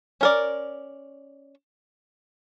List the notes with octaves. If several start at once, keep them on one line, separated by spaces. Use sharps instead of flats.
C#4 A#4 D5